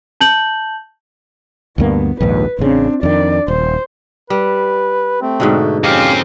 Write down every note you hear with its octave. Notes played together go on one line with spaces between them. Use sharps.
A5 G6 F#7
D2 G2 A#3 B3
A#1 D#2 G#2 B4
A1 C#3 C4 D4
F2 D#3 D4 D5
D#1 C5
G3 B4
A3 C4
G#2 B2 D3
F2 C4 C#4 G4 F5